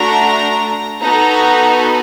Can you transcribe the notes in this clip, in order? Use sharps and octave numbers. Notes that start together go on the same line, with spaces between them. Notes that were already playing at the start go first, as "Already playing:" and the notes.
Already playing: A3 D4 F#4 A#5
B3 D#4 F#4 A4 A#5